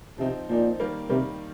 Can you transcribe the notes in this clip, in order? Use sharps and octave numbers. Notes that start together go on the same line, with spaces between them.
C3 F3 C4 D#4
A#2 F3 C4 D#4
D#3 G3 A#3
C3 D#3 G3 A#3